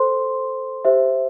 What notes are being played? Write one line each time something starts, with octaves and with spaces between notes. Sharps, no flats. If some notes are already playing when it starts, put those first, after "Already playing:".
Already playing: A4 C5 C6
G4 C5 E5